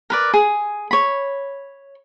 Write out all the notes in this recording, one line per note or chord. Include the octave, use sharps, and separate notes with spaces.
A#4 B4 D5
G#4
C#5 B5